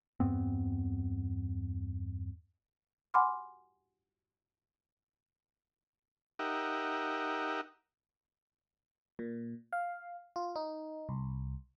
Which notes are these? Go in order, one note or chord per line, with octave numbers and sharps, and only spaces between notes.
E2 G2 B3 C4
F#5 G#5 B5 C6 D6 F6
D#4 G4 A#4 E5 F#5
A#2
F5
F4
D#4
C2